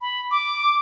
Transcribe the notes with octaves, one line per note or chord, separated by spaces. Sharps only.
B5
D6